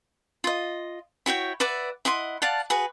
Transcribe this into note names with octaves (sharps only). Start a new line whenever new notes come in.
F4 D#5
E4 F#4 C#5 G5
B4 D5 E5 F#5
E4 D#5 F#5 C6
D5 F5 F#5 A5
F#4 G#4 B4